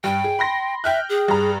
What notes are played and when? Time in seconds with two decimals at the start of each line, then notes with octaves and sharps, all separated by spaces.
0.04 G2 G5
0.24 G#4
0.39 B5 C6 A#6
0.84 E5 G5 F6 F#6
1.09 G#4
1.28 G2 A#5